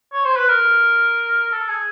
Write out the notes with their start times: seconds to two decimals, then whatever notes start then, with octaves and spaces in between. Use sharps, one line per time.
0.13 C#5
0.25 C5
0.37 B4
0.48 A#4
1.53 A4
1.69 G#4